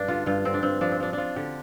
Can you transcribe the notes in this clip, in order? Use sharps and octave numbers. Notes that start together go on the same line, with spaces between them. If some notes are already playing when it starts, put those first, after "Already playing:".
Already playing: G2 D4
D3 F4
G2 F4
D3 C4
D4
G2 C4
F3 D4
C4
F3 D4
F3 D4 F4
D3 G4